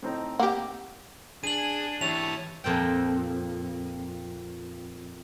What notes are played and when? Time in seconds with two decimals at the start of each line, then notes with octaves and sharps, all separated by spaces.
0.03 A2 C4 D#4
0.39 A#3 G4 F#5
1.44 D4 G#4 G#5 D#7 F#7
2.01 E3 G4 C#5 E5 A5 F7
2.64 F2 A#2 C4 G5